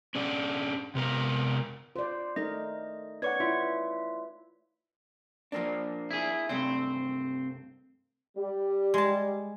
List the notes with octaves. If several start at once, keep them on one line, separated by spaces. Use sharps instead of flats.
C#4 D4 G#4 D5
C3 B3 A#4
F4 C5 D5
A3 D#4 A#4 D#5
B4 C#5 D5 F#5 C#6 G#6
E4 F4 E5
F3 A#3 D4
E4 G#4
C2 G2 A3 C4
G3
G#3 A5